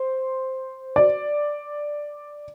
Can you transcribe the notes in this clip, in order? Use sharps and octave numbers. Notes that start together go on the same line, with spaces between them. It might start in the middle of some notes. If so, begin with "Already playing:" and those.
Already playing: C5
D5